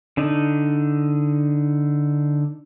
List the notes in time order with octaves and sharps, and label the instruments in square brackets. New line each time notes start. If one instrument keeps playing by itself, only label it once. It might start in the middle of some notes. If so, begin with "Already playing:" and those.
[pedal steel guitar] D3 D4 D#4